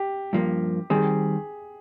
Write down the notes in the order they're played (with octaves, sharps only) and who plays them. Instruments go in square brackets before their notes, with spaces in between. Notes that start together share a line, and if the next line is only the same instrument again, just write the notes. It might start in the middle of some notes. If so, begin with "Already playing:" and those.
Already playing: [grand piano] G4
[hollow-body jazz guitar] G2 F3 A#3
[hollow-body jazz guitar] D#3 G3 C4 [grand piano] G#4